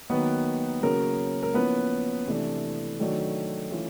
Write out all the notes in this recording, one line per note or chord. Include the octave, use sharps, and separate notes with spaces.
D#3 F#3 A#3 B3 B4
C#3 F#3 A#3 C#4 A#4
A#4
F3 A#3 B3 C#4 E4 B4
C3 E3 A3 D4
D#3 F#3 A3 D4
E3 A3 C#4 F4